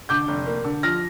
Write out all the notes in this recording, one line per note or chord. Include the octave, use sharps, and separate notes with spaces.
D3 D6 G6
F1
A#3
D3
F3 F6 A#6